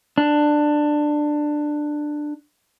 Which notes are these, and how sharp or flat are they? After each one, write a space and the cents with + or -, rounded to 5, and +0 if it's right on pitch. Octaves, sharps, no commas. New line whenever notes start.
D4 +15